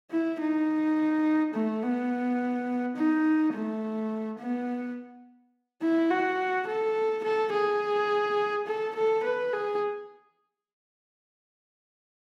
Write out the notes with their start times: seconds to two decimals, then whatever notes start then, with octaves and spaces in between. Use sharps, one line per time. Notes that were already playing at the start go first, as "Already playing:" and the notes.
0.11 E4
0.40 D#4
1.54 A3
1.83 B3
2.97 D#4
3.54 A3
4.39 B3
5.82 E4
6.10 F#4
6.67 A4
7.24 A4
7.53 G#4
8.67 A4
8.96 A4
9.24 B4
9.53 G#4